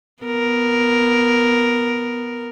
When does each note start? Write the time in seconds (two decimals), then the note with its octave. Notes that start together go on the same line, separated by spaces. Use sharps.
0.23 B3 A#4